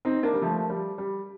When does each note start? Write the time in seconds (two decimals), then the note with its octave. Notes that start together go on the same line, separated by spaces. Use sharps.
0.05 C4 D#4
0.23 A#3 D4
0.34 G3
0.42 F3 A3
0.70 G3
0.98 G3